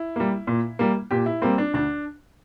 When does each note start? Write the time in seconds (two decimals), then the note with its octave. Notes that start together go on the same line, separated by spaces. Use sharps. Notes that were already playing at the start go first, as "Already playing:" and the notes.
Already playing: E4
0.16 G3 A#3
0.47 A#2
0.79 G3 A#3
1.11 A#2 G4
1.26 E4
1.42 G3 A#3 C4
1.58 D4
1.74 D2 D4